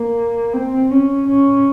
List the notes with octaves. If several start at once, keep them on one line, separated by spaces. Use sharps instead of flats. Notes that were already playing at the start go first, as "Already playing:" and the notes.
Already playing: A#3
C4
C#4
C#4